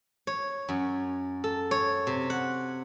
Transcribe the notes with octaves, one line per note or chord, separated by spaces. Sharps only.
C#5
F#2
A4
C#5
C3
F#5